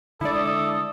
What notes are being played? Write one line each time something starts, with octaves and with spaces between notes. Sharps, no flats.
D3 G#3 E4 A4 D5 D#6